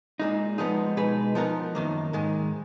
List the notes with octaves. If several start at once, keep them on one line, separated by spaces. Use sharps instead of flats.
A#2 G#3 D#4
F3 G#3 B3 D#4 G#4
B2 G#3 D#4 G#4 B4
F3 B3 D#4 A#4
F#2 D#3 A#3
G#2 D#3 G#3